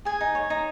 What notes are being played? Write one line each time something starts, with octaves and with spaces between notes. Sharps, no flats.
G#4 G#5
D#4
C#5
D#4